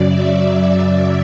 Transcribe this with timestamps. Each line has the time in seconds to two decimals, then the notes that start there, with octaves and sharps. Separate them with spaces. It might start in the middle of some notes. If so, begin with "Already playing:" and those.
Already playing: F#2 C#3 F#3 D5
0.08 E5